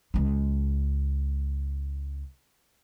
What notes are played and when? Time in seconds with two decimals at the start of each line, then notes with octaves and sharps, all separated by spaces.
0.14 C#2 G#3